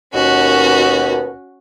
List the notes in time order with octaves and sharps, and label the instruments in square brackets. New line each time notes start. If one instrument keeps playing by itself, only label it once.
[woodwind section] D#2 B2 [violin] C#4 F#4